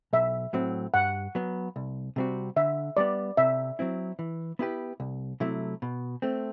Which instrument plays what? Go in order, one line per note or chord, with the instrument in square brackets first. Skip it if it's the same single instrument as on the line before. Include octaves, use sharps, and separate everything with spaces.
[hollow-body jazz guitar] B1 [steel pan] E5
[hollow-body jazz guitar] A2 F#3 C4
[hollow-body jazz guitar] G2 [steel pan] F#5
[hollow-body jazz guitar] F#3 B3
C2
C3 G3 C4 F#4
[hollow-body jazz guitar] D3 [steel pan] E5
[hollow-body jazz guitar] G3 B3 [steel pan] D5
[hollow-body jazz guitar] C3 [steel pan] E5
[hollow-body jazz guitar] F#3 C4 E4
E3
B3 E4 G4 B4
C2
C3 F#3 A3 E4
B2
A3 C4